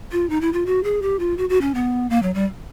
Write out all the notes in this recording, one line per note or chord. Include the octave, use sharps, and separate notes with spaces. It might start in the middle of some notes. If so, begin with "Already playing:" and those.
F4
D#4
E4
F4
F#4
G#4
G4
F4
F#4
F#4
C#4
B3
A#3
F#3
G3